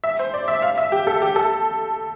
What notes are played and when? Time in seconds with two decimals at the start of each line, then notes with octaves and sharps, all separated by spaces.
0.04 E5
0.19 C5
0.34 D5
0.48 E5
0.62 F5
0.78 E5
0.92 G4
1.07 A4
1.22 G4
1.36 A4